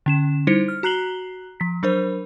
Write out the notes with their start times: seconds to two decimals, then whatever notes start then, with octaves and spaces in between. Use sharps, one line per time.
0.06 D3 C#4 E7
0.47 G3 D#4 E4 C5 C#7
0.68 F6
0.83 F#4 A#5 F#6 C7 F#7 G7
1.60 F3 B6
1.83 F#3 D4 A#4 C5